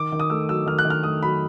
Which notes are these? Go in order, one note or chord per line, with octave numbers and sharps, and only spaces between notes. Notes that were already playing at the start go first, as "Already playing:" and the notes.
Already playing: D#3 D6
D#3
D#6
A3 E6
F#3 E6
D#3 F6
F#6
D#3
F6
A3 D#6
F#3 B5